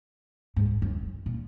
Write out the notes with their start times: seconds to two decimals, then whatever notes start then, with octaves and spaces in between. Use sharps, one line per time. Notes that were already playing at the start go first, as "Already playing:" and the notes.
0.56 G#2
0.82 F#2
1.26 A#2